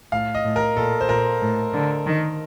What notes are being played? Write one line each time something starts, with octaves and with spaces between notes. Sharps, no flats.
A2 F5
D#5
A2
A#4
A#2 A4
C5
A#2 A#4
A2
D3
D#3